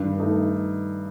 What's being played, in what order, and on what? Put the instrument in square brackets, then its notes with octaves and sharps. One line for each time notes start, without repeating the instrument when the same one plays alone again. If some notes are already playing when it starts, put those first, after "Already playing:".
Already playing: [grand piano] G2 [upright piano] D#3
[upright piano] A3 D#4 A4